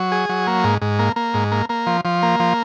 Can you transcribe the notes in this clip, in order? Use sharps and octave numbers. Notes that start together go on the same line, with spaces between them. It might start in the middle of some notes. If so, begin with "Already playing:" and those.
Already playing: F#3
G#4
F#3
A#3
G#2
G#2
A#3
A#3
G#2
A#3
A#3
F3
F3
A#3
F3